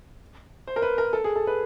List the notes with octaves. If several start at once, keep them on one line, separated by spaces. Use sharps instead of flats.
C5
A#4
B4
A#4
A4
G#4
A4
B4